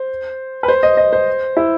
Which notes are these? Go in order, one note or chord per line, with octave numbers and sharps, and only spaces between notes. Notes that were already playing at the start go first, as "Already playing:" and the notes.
Already playing: C5
B4
C5
D#5
D#5
C5
E4